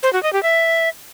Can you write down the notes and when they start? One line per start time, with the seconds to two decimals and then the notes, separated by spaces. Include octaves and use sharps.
0.03 C5
0.13 F#4
0.23 D#5
0.33 G4
0.43 E5